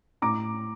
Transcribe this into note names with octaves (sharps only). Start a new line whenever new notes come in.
A2 A#5 D6